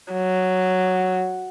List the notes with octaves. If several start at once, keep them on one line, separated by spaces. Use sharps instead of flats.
F#3